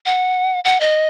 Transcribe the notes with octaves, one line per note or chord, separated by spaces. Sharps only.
F#5
F#5
D#5